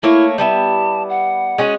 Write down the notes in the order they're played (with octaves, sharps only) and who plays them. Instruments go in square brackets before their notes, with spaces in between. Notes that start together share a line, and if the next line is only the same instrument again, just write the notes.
[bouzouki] A3 A#3 C#5 [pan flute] E4
[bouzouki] G3 B3 E4 [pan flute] A5
[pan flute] F#5
[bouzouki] G#3 C#4 F#4